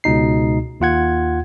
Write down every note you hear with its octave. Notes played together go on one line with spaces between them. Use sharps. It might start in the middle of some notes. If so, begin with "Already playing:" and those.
C#2 B2 D#4 C7
D#2 F4 F#5 G#6